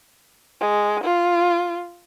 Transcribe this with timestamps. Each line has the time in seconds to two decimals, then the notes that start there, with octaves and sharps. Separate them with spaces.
0.61 G#3
1.03 F4